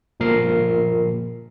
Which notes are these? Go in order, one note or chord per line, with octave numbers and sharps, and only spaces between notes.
G1 A#2 F3 A#4 C7